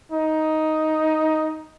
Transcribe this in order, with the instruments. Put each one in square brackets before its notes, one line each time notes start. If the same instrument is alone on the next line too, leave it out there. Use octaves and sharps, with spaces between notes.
[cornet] D#4